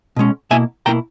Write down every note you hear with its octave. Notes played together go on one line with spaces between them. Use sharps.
B2 G#3 C#4
B2 A#3 E4 E5 G#5
B2 A#3 E4 G5 A#5